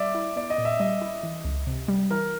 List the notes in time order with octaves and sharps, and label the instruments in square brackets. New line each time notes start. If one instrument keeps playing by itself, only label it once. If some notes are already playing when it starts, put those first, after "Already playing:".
Already playing: [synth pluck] G3 [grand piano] D5 E5
[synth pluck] E4
[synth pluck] B3 [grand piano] D5
[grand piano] D#5
[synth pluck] A#2
[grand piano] E5
[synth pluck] G3 [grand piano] D#5
[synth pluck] E4
E3
C#2
C3
G3
[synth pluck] E3 [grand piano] A#4